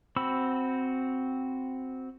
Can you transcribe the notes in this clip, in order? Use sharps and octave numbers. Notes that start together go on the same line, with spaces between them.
C4 F#4 B5 E6